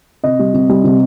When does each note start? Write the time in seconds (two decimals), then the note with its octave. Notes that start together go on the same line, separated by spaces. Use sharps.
0.23 C3 D#5
0.39 G3
0.54 C3
0.69 G3
0.84 C3